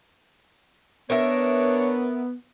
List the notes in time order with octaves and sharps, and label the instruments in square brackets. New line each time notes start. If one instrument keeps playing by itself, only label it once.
[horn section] B3 [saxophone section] D4 C#5 [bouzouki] A#4 E5